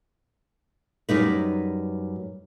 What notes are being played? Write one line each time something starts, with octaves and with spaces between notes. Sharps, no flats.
F#2 G3 D#4 B4